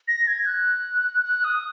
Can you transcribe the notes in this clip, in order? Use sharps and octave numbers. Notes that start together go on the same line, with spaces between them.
A#6
G#6
F#6
F#6
D#6